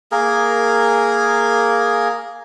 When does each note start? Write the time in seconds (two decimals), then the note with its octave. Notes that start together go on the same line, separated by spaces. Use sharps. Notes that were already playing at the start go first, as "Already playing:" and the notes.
0.12 A#3 G#4 A#4